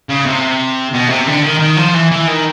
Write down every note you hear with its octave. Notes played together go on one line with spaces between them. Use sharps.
C#3
C3
B2
C3
D3
D#3
D#3
F3
E3
E3
D#3